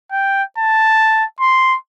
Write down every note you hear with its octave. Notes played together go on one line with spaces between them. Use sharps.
G5
A5
C6